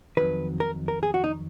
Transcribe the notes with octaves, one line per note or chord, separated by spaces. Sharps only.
F2 D#3 F#3 B4
A#4
A#4
G#4
F#4
D#4